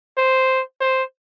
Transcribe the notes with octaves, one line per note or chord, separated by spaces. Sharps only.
C5
C5